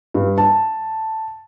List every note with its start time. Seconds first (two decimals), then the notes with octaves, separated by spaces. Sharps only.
0.14 G2
0.38 A5